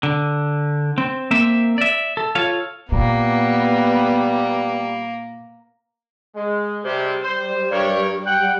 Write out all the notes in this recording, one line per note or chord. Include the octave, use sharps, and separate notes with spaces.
D3
C4
A#3 C4 E5
D5 E5
A4
F4 A4 C#5 F5
A#2 G3 A#3 B3
G#3
C3 G3 G#3
G3 C5
G2 A#4 C#5
F#5 G5